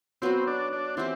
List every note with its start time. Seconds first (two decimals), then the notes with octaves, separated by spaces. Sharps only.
0.22 F#3 B3 C4 F#4
0.47 D4
0.73 D4
0.97 E3 B3 C4 E4 G4